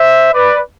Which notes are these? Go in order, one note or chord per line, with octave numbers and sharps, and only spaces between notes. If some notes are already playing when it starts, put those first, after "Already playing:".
Already playing: C5 E5
B4 D5